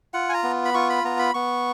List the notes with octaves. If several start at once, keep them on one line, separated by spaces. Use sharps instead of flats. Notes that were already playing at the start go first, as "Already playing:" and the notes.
F4 F#5
G#5
A#5
B3
B5
F4 C#6
B5
B3 A#5
B5
B3 C#6